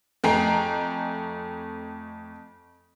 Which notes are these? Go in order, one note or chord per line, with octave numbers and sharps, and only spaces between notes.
F2 A3 G5 G#5 A#5 C7